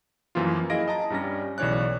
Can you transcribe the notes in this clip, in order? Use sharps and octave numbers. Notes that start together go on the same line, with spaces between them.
F#2 E3 F3 A#3 F4
E4 G#4 D#5 F5 A#6 D7
D#5 A5 A#5
G2 G3 C#4 A#6
B1 C#3 E3 C#5 D5 F#6